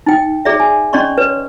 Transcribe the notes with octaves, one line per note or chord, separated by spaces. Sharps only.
D#4 G5
G#4 D5 E5
G#5
C#4 D5 D#5 C6 C#6
B4 C#5